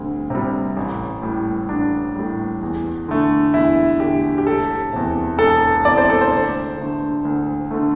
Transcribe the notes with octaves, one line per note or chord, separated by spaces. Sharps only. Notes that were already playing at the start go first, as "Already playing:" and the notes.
Already playing: D2 C3 G3
C3 G3
A1
A2 G3
A1 D4
A2 G3
E2
D3 A3
E2 E4
D3 A3 G4
G4
E1 A4
E2 C3
E1 A4
E2 C3 D5
C5
A4
C5
D2
D3 A3
D2
D3 A3